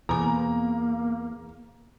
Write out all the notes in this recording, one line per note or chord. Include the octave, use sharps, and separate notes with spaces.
E2 B2 A#3 G#5 A#5